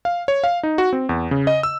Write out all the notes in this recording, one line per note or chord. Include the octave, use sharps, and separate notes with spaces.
F5
C#5
F5
D#4
F#4
C4
E2
C#3
D#5
E6